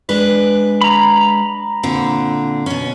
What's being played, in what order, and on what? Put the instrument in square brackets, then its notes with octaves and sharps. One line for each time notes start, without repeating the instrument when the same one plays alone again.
[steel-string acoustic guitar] G#3 D4 B4
[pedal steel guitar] A#5 B5
[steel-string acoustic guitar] A#2 D3 C4
B2 C#4